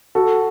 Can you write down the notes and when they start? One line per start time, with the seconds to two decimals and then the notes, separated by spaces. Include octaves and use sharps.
0.15 F#4 A4